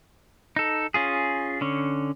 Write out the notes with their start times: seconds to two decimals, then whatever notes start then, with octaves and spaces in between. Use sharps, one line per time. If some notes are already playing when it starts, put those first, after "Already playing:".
0.56 D#4 A4
0.94 C#4 F4 G#4
1.61 D3 C#4